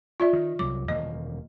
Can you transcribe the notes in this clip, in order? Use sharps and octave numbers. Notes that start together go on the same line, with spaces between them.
F4 D5 E5
D#3
C2 F#3 D6
E1 D#3 A#3 D#5